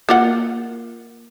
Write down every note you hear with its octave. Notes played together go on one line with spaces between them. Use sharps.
A#3 F4 F#5